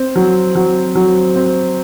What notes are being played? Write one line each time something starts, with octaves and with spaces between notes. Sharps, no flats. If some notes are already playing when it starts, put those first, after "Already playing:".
Already playing: C4
F#3
F#3
F#3
C4